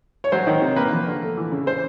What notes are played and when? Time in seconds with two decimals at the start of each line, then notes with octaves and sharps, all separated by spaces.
0.24 C#5
0.32 F#3 C5
0.47 D#3
0.62 C3
0.76 A#3 B4
0.92 F3
1.06 D3
1.21 A3
1.37 E3
1.52 C#3
1.67 C5